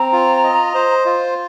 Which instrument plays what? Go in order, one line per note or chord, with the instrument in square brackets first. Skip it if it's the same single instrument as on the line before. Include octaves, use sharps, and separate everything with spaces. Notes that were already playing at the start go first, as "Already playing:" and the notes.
Already playing: [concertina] C4 [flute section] A#5
[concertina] F4
D#5
C5
F4